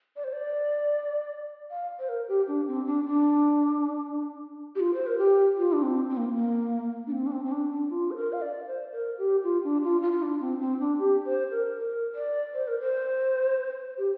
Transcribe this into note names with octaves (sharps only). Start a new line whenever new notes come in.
D5
C5
D5
F5
C5
A#4
G4
D4
C4
D4
D4
G4
F4
C5
A#4
G4
F4
D4
C4
C4
A#3
A#3
D4
C4
D4
C4
C4
D4
D4
F4
C5
A#4
F5
D5
C5
A#4
G4
F4
D4
F4
F4
F4
D4
C4
C4
D4
G4
C5
A#4
A#4
D5
C5
A#4
C5
G4